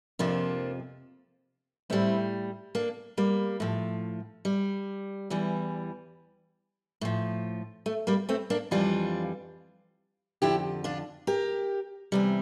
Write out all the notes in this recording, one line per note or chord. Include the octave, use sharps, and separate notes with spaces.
F2 C3 F3 A#3 D4
A2 G3 C4 E4
A#3 D4
G3 A#3
A2 F3
G3
E2 E3 G3
A2 F3
A3
G3 A#3
A3 C4
A#3 D4
F2 E3 G3 D4 F4
F2 D3 F3 E4 G4
D4 F4
G4 A#4
E2 C3 G3